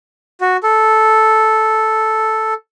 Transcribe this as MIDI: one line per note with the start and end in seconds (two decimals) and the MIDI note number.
0.41 0.57 66
0.63 2.54 69